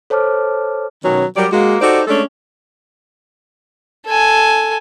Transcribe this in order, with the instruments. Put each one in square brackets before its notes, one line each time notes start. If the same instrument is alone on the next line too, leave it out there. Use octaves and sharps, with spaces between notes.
[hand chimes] A4 C5 C#5 A5 D6 F6
[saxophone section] B2 D#3 F#3 B3 C#4
F#3 G3 G4 A#4 C#5 D5
G#3 A#3 F#4
D#4 F#4 G4 A4 C5 D5
G#3 A3 C#4 D4 A4
[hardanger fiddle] A4 G#5